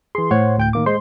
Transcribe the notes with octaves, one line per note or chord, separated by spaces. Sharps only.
E3 G#4 C6
A2 C5 C#5 F#5
D2 G5 G6
D#3 A#3 D6
G#3 C5 C6